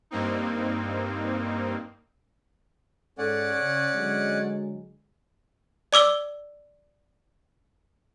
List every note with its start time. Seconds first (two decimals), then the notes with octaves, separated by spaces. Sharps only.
0.11 G2 A#3 C4 D#4
3.18 G#2 G#3 C#4 A4 D5 F#5
3.57 C#3
3.94 D3 F#3 G#3
5.93 D5 D6 E6 G7